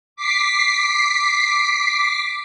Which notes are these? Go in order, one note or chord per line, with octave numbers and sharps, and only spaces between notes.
D6 B6 C7